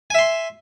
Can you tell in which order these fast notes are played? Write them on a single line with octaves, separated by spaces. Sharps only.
G#5 E5 C6